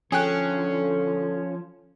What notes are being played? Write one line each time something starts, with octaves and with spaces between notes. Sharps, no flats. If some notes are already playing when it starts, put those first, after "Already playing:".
D3 F3 C#4 G#4 A4 G5 F#6